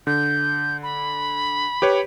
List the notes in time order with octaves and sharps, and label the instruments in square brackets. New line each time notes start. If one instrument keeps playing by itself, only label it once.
[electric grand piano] D3 [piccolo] G6
[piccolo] B5
[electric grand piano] G4 B4 C#5